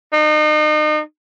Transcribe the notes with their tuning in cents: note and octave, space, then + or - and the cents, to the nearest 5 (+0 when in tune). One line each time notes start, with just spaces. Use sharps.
D#4 -35